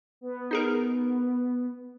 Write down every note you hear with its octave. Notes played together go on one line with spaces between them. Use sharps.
B3
D#4 G#4 A#4